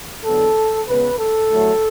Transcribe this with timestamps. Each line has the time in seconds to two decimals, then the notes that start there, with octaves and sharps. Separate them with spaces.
0.25 E2 D3 F#3 B3 A4
0.88 C#3 G#3 B3 B4
1.19 A4
1.50 E2 D3 F#3 A3